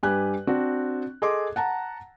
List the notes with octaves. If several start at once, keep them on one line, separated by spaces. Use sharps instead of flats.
G2 G4 B4 G#5 F#6
C4 D4 F#4
G#4 A4 D#5 C6 D6
F#5 A5 A#5